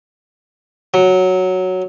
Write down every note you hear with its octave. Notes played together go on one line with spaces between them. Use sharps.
F#3